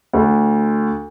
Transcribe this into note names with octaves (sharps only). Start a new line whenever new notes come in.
D2